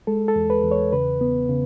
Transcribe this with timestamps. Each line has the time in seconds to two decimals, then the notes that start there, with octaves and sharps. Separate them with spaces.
0.07 G#3 A4
0.28 A4
0.36 E2
0.50 B4
0.64 E2
0.71 C#5
0.92 C#3 B4
1.21 B3
1.49 C#3